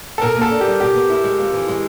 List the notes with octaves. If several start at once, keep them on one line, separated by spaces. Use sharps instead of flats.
A4
B2 A#4
A#3
A4
D4
G3 G4
B2 G4
B3
E4
G#3
F2
E3
G#3